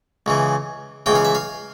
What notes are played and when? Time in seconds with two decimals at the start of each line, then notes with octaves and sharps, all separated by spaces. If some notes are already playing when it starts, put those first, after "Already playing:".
0.26 C#2 C#3 E3
1.06 C#2 C#3 E3 G5
1.15 F5
1.25 E5
1.35 F5